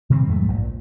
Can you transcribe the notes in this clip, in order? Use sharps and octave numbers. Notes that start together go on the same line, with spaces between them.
C3 D#3 G3 C4
F2 G#2 F#3 A3
A#1 A#2